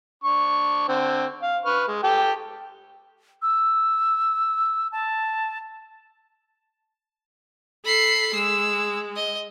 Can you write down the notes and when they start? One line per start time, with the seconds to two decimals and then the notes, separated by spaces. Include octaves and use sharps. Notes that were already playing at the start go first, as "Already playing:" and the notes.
0.24 D4 C#6
0.88 D3 C4
1.43 F5
1.66 B4 C#6 F6
1.88 G#3
2.03 G4 A4 G5
3.42 E6
4.92 A5
7.85 A4 B5 C7
8.35 G#3 E6
9.16 D#5